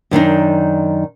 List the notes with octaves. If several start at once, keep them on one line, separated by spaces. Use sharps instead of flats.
F#2 D#3 D4 D#4